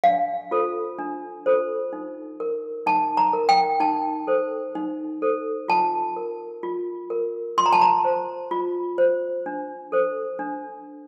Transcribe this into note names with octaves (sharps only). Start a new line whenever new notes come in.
D4 F5
F4 A4 C5
D4
F4 A4 C5
D#4
A#4
D#4 A5
A#5
A#4
G5
D#4 A5
A4 C5
D#4
A4 C5
F4 A5
A#4
F4
A#4
F4 C6
A#5
A5
A#5
C5
F4
C5
D4
A4 C5
D4